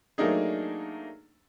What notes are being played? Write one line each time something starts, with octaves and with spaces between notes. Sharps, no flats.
F#3 A3 A#3 D4 D#4 G#4